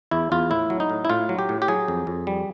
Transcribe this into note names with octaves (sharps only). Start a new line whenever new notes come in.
E2 E4
E2 F4
A2 E4
F#3
D#4
A2
E4
A2 F4
F#3
G4
A2
G4
F#3 G#4
F2
F2
G3